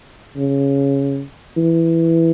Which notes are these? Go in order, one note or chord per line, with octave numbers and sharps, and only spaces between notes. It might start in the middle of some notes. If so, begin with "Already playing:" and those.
C#3
E3